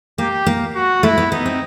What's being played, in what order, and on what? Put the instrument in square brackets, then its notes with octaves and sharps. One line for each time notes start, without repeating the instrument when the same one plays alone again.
[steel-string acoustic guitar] A#3 [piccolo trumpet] G4
[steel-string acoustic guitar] A#3
[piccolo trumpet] F#4
[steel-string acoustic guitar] A3 [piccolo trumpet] E4
[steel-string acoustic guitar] B3
[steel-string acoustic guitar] B3 [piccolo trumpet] D#4
[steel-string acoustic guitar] C4